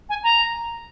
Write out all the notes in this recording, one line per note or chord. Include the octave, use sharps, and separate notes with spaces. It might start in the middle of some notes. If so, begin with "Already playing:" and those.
G#5
A#5